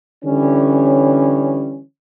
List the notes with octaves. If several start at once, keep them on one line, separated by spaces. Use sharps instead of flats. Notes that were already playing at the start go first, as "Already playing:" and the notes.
D3 E3 G3 C#4